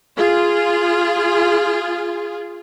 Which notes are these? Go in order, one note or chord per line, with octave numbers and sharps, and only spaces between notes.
F4 G#4